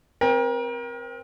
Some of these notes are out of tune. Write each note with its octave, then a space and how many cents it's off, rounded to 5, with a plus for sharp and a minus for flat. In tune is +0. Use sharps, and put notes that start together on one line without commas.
C4 +0 A#4 +30 G5 +25